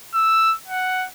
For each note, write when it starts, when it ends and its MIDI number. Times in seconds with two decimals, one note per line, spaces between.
0.14 0.55 88
0.68 1.08 78